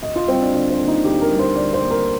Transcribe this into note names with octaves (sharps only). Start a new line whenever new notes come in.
D2 D#5
F4
G3 C4
D4
D3 D4
C4
A#3
D#4
D2 G4
A#4
G3
C5
D3 D5
C5
A#3
A#4